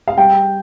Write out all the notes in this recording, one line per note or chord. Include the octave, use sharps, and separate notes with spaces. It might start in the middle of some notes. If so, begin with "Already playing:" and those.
F5
G3 G5